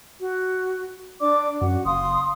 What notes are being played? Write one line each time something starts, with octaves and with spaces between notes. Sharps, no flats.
F#4
D4 D5 D6
F#2 F#4 F#5
F#1 F5 C6 D#6